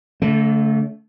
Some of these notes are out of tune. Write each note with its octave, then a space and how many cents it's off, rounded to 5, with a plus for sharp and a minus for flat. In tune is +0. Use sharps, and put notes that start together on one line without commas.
D3 -40 A3 +0